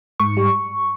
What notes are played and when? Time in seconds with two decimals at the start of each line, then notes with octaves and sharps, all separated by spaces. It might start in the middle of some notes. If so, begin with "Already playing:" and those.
0.20 G#2 C#6
0.37 G3